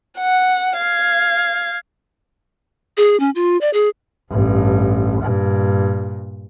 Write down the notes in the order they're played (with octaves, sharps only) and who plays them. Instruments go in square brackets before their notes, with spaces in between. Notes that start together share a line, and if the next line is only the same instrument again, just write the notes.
[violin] F#5
F5 G#6
[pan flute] G#4
C#4
F4
D5
G#4
[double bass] A1 G2
G2 A#2